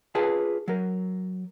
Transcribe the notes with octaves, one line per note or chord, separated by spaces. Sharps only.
F4 G#4 B4 A5
F#3 A#4